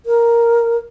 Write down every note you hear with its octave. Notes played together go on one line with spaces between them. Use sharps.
A#4